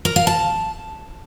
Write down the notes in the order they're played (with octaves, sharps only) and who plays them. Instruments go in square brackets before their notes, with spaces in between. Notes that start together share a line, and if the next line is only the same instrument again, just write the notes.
[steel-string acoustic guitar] A#4
F5
A5